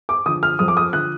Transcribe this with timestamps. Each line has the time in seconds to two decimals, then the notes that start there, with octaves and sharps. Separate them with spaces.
0.09 D6
0.26 D3 F3 D#6
0.43 F6
0.59 F2 D#6
0.68 D6
0.77 D#6
0.93 D3 F3 F#6